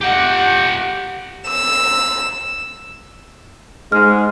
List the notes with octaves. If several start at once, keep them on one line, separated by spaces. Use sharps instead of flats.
G4 F#5
E6
G#2 G#3 F6